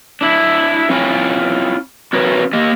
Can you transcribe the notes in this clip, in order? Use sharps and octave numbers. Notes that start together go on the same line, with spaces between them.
D4 E4
C4 E4 F4 C#5 G5 G#5
C4 F#4 A#4 B4 C#5
A#3 G4 D#5